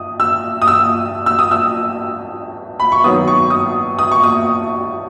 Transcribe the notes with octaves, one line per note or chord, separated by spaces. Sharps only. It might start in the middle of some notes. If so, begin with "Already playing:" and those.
Already playing: D#6
E6
D#6
E6
E6
D#6
E6
B5
C#6
D#3 F#3 B3 D#6
C#6
D#6
D#6
C#6
D#6